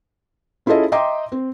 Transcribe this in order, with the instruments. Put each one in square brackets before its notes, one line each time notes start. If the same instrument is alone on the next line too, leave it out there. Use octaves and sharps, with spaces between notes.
[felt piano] C#4 E4 F4 G#4 A4 D#5
D#5 E5 G5 A#5 C6 D6
C4